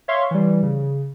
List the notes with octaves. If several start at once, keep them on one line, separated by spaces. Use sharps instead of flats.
C#5 E5 F5 C6 C#6
E3 G3
C#3